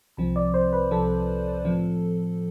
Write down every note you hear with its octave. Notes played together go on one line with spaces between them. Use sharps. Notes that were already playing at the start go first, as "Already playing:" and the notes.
C2 C3 F3 C4
D5
C5
B4
C2 C3 F3 C4 A4
A2 F3 C4